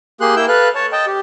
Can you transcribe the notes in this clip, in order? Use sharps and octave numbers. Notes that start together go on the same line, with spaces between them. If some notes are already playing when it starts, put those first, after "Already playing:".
A#3 G4 G#4 C6 F#6
A#3 E4 G5 E6 G6
A4 B4 F5 F#6
C#5 A5
D#5 G5 A5
G4